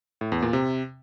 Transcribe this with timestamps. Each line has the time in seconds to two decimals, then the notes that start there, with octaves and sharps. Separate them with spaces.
0.21 A2
0.32 E2
0.42 A#2
0.53 C3